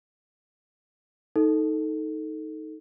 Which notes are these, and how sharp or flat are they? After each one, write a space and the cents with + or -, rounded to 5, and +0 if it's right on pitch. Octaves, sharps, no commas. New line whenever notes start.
D#4 +10 A4 +0